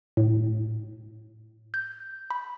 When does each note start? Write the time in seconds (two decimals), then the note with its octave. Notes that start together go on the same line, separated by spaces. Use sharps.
0.17 A2
1.74 G6
2.30 B5